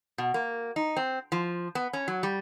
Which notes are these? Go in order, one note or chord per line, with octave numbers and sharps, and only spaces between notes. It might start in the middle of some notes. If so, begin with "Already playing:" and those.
B2
A#3
D#4
C4
F3
B3
C#4
F#3
G3